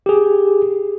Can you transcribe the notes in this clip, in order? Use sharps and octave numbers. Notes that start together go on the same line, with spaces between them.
G4 G#4